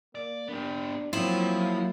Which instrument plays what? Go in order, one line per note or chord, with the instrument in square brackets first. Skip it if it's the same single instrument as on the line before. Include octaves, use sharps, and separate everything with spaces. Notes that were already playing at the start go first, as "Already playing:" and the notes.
[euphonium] A#3 [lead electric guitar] D5
[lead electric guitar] B3 G4 [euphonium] D4
[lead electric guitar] F3 [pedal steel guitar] F#3 A#3 F4 [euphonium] C4 [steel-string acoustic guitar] E4